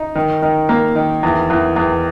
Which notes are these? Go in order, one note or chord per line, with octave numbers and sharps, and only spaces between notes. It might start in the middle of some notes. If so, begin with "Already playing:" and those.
Already playing: D#4
D#3
D#3
A#3
D#3
E2
E2
E2